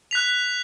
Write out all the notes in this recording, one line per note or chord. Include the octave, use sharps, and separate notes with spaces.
F#6 B6 F7